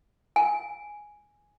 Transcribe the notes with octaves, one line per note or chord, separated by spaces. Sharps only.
G#5